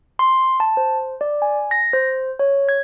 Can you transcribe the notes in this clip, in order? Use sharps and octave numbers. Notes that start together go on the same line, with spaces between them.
C6
A5
C5
D5
G#5
A#6
C5
C#5
G#6